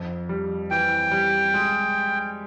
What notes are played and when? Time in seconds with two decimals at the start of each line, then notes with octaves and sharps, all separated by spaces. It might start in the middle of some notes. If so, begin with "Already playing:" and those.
Already playing: F2
0.29 G3
0.71 E3 G5
1.11 G3
1.54 G#3